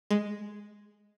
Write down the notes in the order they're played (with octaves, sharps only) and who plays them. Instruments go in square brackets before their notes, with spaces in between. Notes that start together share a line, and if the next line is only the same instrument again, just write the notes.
[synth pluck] G#3